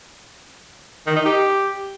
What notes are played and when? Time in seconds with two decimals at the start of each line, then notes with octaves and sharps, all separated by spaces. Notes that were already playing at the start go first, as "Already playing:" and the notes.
1.07 D#3
1.16 D#4
1.25 G4